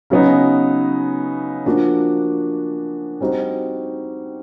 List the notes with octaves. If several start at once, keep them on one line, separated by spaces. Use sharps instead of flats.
C#3 F#3 B3 D#4
F3 A#3 D4 F#4
G3 C4 D#4 F#4